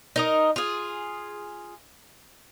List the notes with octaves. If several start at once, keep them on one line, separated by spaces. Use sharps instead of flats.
D#4 A#4 D#5
F4 G#4